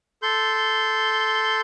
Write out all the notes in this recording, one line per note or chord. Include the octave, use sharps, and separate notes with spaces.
A4 C6 G6